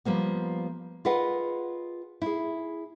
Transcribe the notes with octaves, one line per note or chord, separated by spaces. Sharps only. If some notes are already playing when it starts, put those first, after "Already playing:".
F3 G3 A#3 B3
F4 G#4 A#4 B4 D#5 F#5
E4 G#4